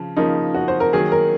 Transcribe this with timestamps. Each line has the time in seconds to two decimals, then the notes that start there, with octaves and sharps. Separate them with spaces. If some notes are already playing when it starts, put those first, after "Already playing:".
Already playing: C#3 F3
0.17 C#3 F3 A#3 D#4
0.54 F#4
0.68 C5
0.80 A#4
0.93 D#3 F#3 A#3 G#4
1.12 A#4